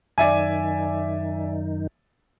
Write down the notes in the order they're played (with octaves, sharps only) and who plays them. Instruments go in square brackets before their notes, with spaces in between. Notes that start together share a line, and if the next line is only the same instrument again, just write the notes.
[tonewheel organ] F#2 D#3 D#4 [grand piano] D5 E5 G#5